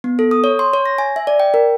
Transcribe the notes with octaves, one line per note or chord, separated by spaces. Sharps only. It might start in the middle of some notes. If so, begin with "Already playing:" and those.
B3
A4
D#6
C#5
C6
C#5
A#6
G#5
E5
D5
G5
A#4